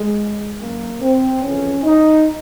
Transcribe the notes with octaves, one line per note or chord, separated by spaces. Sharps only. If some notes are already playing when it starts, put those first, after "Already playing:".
Already playing: G#3
F#2 D#3 A#3
C4
F2 C#3 E3 C#4
D#4